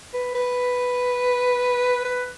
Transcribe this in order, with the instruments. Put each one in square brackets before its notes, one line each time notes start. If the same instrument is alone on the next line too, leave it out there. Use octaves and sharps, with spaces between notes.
[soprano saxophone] B4
B4
B4